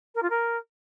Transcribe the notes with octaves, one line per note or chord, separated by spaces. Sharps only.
A#4
F4
A#4